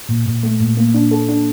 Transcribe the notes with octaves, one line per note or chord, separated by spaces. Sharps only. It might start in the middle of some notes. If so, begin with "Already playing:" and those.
A#2
A#2
A3
A#2
A#3
D4
A4
D4